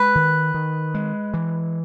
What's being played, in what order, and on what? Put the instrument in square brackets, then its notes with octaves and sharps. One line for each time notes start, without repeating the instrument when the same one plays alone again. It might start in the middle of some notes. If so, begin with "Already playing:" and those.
Already playing: [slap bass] G#3 [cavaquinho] B4
[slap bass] D#3
D#3
G#3
E3